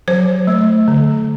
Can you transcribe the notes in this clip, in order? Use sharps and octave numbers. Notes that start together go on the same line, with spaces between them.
F#3 C5
A3
D3